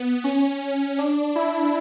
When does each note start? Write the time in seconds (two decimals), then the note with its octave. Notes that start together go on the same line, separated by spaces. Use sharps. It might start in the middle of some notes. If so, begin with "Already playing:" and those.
Already playing: B3
0.24 C#4
0.98 D4
1.36 E4